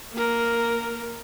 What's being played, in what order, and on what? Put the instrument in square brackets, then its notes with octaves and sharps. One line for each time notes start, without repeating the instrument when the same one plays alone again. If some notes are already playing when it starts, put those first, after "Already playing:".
[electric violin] A#3 A#4